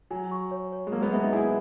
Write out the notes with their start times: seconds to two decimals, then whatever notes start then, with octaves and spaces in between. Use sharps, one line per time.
0.11 F#3 G#5
0.31 C#6
0.51 C#5
0.72 C#5
0.87 G#3
0.92 F#3 A#3 A#4
1.02 G#3 B3
1.13 G#3 B3 E5
1.23 B3 D#4
1.33 E4 G#4 G#5